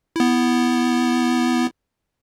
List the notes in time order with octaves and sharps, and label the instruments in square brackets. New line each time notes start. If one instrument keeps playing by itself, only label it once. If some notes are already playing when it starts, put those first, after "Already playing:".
[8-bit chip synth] B3 E4